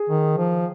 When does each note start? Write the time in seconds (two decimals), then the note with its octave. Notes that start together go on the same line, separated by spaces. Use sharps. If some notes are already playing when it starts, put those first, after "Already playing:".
Already playing: G#4
0.09 D#3
0.37 F3